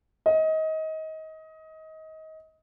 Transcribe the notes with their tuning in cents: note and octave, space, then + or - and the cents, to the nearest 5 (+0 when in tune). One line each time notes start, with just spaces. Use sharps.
D#5 +25